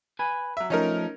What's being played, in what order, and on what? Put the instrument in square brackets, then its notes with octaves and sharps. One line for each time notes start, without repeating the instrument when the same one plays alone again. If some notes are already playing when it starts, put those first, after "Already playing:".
[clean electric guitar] B4 G#5
[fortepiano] F#3 E5
[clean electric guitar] F3 A3 [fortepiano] C#4 D#4 A#4